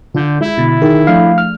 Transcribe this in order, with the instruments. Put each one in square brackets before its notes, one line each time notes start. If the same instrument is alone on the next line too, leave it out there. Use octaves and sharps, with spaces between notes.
[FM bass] D3 [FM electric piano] F4 G6
[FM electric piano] G#3 [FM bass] E4
[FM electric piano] B2 D3 A6
[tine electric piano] D#3 [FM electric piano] G#4
[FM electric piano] F3 A3 D4 [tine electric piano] F5
[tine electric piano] F6